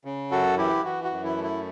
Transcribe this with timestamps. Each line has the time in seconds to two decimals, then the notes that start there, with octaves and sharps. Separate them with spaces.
0.05 C#3
0.31 F#2 F#4 A4
0.58 E3 E4 G4
0.84 E3 F#4
1.04 F#4
1.11 F#2
1.24 E4
1.37 A3
1.44 E4